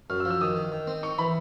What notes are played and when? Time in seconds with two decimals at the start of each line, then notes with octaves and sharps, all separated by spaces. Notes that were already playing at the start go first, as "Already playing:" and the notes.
0.10 F#2 F6
0.20 E6
0.25 F3
0.30 E6
0.41 D#3 D#6
0.56 D#3
0.72 D#3
0.87 C4
1.03 D#4 C#6
1.18 E3 B5